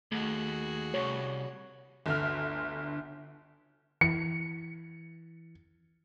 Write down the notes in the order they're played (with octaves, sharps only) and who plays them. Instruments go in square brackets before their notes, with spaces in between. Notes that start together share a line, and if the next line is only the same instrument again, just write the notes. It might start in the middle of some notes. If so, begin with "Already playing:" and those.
[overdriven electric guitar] D#2 [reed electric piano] A3 [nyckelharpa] F#4 G#4
[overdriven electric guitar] C2 [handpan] C#5
[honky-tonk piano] G1 D2 F6
[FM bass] E3 [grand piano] C#7